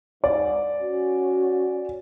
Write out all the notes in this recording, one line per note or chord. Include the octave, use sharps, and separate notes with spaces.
G#2 D5
C#4 F#4